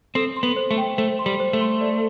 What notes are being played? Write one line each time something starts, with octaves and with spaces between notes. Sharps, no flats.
C4 A4
C6
B3
C5
A3
G5
A3 C5
C6
G3
C5
A3
C6
D5